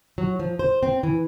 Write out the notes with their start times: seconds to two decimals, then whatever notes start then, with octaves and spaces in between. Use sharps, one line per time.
0.18 F#3
0.39 F3
0.59 C5
0.83 C4
1.03 E3